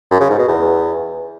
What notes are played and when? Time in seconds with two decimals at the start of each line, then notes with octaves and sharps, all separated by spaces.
0.11 F#2
0.20 C#3
0.30 G#2
0.39 B2
0.48 E2